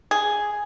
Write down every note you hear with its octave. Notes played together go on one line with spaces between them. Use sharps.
G#4